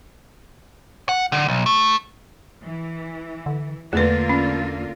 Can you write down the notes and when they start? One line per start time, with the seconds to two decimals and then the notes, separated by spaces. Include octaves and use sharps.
1.09 F#5
1.32 D3
1.48 B1
1.66 A3
2.66 E3
3.46 D3
3.93 E2 D3 A3 A#3 F4 B4
4.29 C#4